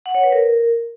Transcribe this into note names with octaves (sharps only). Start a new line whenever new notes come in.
F#5
C#5
B4
A#4